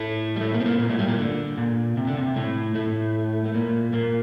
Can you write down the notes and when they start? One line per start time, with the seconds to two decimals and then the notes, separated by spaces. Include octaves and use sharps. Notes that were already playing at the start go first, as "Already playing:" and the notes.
Already playing: A2 A3
0.36 G3
0.40 A2 A3
0.53 A#2 A#3
0.60 C4
0.66 A#2 A#3
0.79 A#2 A#3
0.89 A2 A3
0.99 G2 G3
1.09 A#2 A#3
1.19 D3
1.58 A#2
1.97 C3
2.07 D3
2.17 C3
2.36 A2 A3
2.75 A2 A3
3.46 A3
3.54 A#2 A#3
3.93 A#2 A#3